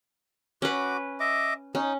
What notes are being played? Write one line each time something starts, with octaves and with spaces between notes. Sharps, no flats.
C#4 F#4 B4 D6
D#5 E5 D6
C#4 D#4